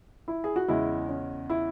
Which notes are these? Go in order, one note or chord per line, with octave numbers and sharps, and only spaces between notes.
E4
G#4
F#4
E2 C#3 G#3 E4
C#4
E4